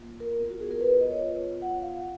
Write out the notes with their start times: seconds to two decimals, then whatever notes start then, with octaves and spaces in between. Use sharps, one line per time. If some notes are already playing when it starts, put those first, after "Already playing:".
Already playing: A#3 F4
0.20 A#4
0.40 B3 F4
0.50 F#4
0.60 G#4
0.71 A#4
0.81 B4
1.01 D#5
1.11 C#5
1.21 B3 F4
1.62 F#5
1.82 F5